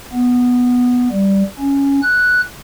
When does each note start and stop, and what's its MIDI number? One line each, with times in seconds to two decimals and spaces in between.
0.13 1.09 59
1.11 1.43 55
1.59 2.00 61
2.03 2.41 90